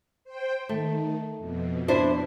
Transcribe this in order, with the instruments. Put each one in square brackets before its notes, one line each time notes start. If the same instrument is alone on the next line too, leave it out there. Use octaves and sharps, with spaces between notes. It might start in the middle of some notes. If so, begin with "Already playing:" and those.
[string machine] C5 G5
[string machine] D#3 [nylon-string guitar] A3
[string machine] F2 B2
[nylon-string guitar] D4 E4 C5